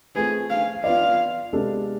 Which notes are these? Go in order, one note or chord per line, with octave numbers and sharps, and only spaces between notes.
A3 C4 F4 G#4 B4
F5
B3 F4 B4 D5 F5
C3 G#3 B3 D4 A4